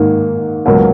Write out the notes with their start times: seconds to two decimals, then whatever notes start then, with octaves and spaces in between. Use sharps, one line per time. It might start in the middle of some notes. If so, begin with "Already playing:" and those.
Already playing: G#2 D#3 A#3
0.65 C#2 B2 F#3 A#3 A#4